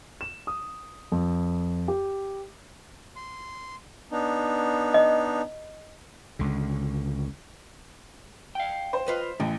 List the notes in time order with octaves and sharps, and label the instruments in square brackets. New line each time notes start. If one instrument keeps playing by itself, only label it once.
[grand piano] E7
D#6
F2
G4
[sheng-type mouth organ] C6
B3 D4 D#4
[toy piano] D#5
[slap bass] C#2 D3
[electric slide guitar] F5 G5
[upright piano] C5
[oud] F4 B4 D#5
[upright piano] A1 [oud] E3